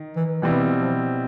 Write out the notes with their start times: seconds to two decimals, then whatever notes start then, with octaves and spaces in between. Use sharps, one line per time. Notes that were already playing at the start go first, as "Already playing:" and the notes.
Already playing: D#3
0.16 E3
0.42 B2 E3 G3 C4 E4
0.80 F3